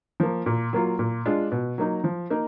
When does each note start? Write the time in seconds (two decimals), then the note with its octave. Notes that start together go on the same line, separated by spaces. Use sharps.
0.20 F3 A#3
0.46 A#2
0.73 F#3 A#3 F4
0.99 A#2
1.25 G#3 D4 F4
1.52 B2
1.78 F#3 A#3 D#4
2.04 F3
2.30 A#3 D#4